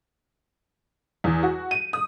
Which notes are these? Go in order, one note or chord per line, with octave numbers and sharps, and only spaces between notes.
E2
F#4
D#7
D#6